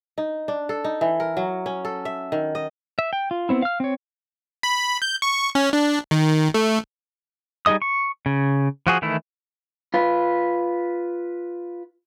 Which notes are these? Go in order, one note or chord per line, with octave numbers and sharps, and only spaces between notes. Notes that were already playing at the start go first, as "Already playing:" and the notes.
D#4
D4
A4
D#4
E3
A#4
F#3
C#4
A4
E5
D#3
D#5
E5
G5
F4
B3 C4 E4
F5 F6
C4 C#5
B5
G6
C#6
C#4
D4
D#3
A3
G3 D#4 G#4 D#5 D#6
C#6
C#3
F3 F#4 G#4
D#3 E3 A3 E4
F4 B4